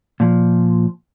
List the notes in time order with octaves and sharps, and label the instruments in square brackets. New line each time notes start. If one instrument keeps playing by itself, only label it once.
[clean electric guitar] A#2 F3